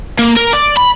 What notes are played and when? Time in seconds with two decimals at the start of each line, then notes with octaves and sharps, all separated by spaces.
0.19 A#3
0.37 A#4
0.53 D5
0.77 B5